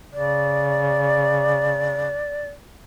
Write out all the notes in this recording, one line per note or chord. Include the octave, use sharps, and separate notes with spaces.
C#3 D5